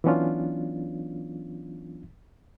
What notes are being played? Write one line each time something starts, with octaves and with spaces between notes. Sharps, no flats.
E3 F#3 B3 C#4 D4 F4